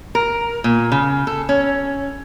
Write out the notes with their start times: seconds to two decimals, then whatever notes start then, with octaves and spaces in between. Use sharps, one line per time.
0.15 A#4
0.64 A#2
0.92 C#3
1.27 A4
1.49 C#4